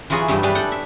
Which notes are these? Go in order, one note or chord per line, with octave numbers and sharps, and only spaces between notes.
E3 F#3 F4 F#4 G#4
G2 E3 G3 A3
G3 D4 G#4 B4
A4 F#5 G5
E5